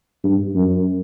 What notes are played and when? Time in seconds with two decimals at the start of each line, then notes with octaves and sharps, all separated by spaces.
0.24 G2
0.55 F#2